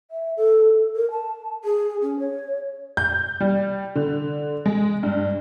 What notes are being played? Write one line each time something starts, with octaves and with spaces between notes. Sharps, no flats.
E5
A4
A#4
A5
G#4
C#4
C#5
G6
G3
D3
G#3
G2